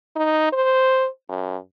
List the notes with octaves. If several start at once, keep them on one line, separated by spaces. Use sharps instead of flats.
D#4
C5
F#2